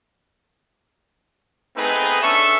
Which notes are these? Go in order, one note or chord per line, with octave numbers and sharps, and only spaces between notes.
A3 B3 C4 D#4 G#4 B4
C#4 D4 A4 E5 C#6